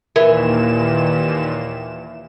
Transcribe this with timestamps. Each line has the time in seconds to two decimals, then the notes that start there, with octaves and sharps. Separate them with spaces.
0.16 D#2 A#2 E3 A#4 E7